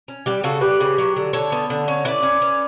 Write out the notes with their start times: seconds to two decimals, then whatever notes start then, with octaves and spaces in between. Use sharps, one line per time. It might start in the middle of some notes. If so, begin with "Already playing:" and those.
0.08 C#4
0.26 G3 G4 B4
0.43 C#3 F#4 A4
0.61 G3 G4 B4
0.80 C#3
0.98 F#3
1.16 D3
1.33 D3 A4 C#5
1.52 B3
1.70 D3
1.88 C#4
2.05 E4 B4 D5
2.23 C#4
2.42 C#4